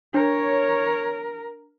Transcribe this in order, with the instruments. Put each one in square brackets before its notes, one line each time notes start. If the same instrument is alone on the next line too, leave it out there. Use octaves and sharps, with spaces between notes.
[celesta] D4 [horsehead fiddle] A#4 [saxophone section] C#5